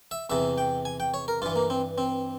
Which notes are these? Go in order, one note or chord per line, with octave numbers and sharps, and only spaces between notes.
E5
E2 C3 E3 E5
G5
G#5
G5
C#5
A#4
G2 E3 F4
A#3
C4
C4